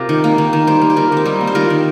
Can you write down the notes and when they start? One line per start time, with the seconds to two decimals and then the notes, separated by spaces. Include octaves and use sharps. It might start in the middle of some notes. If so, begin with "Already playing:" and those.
Already playing: C3 F4 G4 A#4
0.09 D#3
0.24 A#3
0.38 D#3
0.53 D#3
0.67 G3 G4 C5
0.81 A#3
0.90 G4
0.96 D#3 F4 A#4
1.12 D#3 C4
1.25 G3 D#4
1.41 A#3
1.47 C5
1.55 D#3 F4 A#4
1.70 D#3